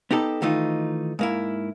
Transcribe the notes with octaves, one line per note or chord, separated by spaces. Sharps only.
B3 D#4 G4 A4
D#3 E3 A3 D#4 F4
G#2 A#3 E4